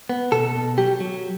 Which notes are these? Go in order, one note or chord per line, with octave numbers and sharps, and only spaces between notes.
B3
B2 A4
B2
F#3 G4
F#3